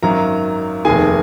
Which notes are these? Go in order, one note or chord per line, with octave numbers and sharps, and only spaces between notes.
G#1 F#2 D#3 F#3 A#4 A#5
F1 D#2 D#3 G#4 G#5